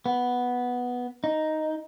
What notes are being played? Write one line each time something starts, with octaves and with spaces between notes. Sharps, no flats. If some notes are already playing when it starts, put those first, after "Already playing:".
B3
D#4